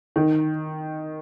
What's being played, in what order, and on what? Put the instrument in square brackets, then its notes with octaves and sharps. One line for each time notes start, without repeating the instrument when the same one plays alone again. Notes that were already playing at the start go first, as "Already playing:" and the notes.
[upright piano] D#3